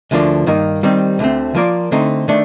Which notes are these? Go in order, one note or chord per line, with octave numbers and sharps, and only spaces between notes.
D2 D3 F3 A#3 D4
G2 D#3 A#3 D#4
D#3 G3 C4 D#4
D2 D3 A3 C4
F3 A#3 F4 A#4 D5
D3 A3 C4 D#4
D#3 A3 D4 A4